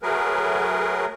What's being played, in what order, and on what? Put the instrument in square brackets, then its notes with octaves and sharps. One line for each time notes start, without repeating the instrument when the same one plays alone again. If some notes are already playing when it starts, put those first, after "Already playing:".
[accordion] F#3 A3 G#4 A#4 B4